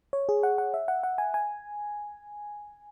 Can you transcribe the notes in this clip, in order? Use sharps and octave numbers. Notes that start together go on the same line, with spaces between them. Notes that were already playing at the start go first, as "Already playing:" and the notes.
C#5
G#4
F#5
F#5
E5
F#5
F#5
G#5
G#5